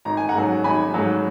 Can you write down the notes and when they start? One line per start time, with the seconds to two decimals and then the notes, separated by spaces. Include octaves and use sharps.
0.05 G#1 A#5
0.17 G#5
0.29 F#5 A#5
0.35 G#2 F#3
0.64 G#1 G#5 B5
0.94 G#2 F#3